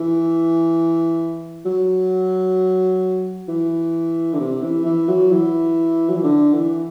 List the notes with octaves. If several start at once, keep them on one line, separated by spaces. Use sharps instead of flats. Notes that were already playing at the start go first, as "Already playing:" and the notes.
Already playing: E3
F#3
E3
D3
C3
E3
E3
F#3
E3
F#3
E3
D3
E3